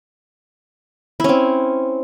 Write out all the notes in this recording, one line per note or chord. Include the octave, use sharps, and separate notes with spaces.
C4 C#4 E4